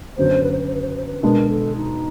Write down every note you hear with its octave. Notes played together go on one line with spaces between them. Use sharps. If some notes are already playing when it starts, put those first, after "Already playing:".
F#2 D3 F#3 B3 C5
B4
C5
B4
C5
B4
C5
B4
C5
B4
B2 G#3 B3 D4 A#4
A4
D#4